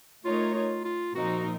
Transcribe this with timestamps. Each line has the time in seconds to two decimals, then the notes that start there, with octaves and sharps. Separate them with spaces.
0.25 A3 D#4 F4 A#4 C#5
0.55 F4
0.85 F4
1.15 A#2 F3 C4 D#4 F#4 A#4